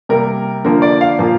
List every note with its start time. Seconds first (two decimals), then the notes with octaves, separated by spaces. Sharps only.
0.09 C3 G3 A#3 A#4
0.65 D3 F3 A#3 A#4
0.82 D5
1.01 F5
1.19 A#2 F3 A#3